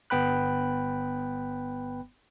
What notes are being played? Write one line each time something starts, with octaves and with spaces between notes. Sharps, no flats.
G1 B3 G5 B5 F#6